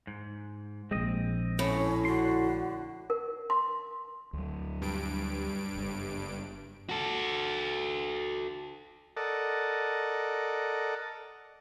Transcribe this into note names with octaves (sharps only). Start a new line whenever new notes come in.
G#2
A#1 G#3 C4 D#5
A2 C#4
D3 F#4 C6
A#4
C6
D2 F#3
G2 D7
F#1 G3
F#4 A4
A4 A#4 D5 D#5 F#5 A5